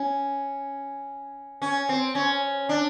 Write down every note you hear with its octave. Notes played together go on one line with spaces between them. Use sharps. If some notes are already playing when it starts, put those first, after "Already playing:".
Already playing: C#4
C#4
C4
C#4
D4